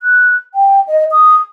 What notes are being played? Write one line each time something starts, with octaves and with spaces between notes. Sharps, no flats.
F#6
G5
D#5
D#6